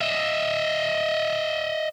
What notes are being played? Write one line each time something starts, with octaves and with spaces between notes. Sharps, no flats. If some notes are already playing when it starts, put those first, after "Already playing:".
D#5 E5